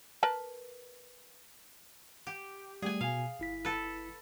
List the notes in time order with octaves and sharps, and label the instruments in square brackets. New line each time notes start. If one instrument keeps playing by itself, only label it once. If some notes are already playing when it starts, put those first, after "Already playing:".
[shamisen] A#4 B4 A5
[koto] G4
[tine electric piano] G3 A3 [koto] G#4 G#5
[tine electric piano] B2 G#5 [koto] F5
[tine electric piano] G1 E4 B6
[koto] A4 B4